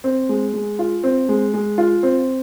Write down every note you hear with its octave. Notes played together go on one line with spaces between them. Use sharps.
C4
G#3
G#3
F4
C4
G#3
G#3
F4
C4